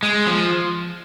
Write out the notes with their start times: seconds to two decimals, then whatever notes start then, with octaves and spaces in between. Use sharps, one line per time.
0.03 G#3
0.27 F3